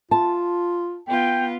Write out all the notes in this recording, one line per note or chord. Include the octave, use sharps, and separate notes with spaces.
F4 A5
B3 F4 G5